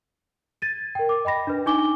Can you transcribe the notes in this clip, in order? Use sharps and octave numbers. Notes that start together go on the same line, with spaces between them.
G#6 A6 D#7
A#4 G5
D6
D#5 G5 B5 A#6
D4 B4
D4 D#4 G#5 C#6 D6 G7